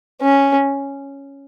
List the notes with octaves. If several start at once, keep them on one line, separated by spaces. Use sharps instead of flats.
C#4